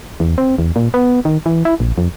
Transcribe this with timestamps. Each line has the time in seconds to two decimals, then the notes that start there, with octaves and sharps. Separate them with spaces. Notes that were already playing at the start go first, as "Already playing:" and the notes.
0.20 E2
0.38 C4
0.58 E2
0.76 A#2
0.94 B3
1.25 D#3
1.46 E3
1.65 E4
1.80 A#1
1.98 F2